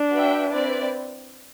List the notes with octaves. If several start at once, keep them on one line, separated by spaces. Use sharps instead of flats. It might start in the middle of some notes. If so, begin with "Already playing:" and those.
Already playing: D4
F#4 B4 E5 G5
C4 E4 B4 D5